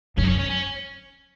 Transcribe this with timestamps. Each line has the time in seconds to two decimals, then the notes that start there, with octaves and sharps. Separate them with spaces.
0.17 F#2 C#4
0.24 D#4
0.29 C#4
0.39 C#4
0.50 C#4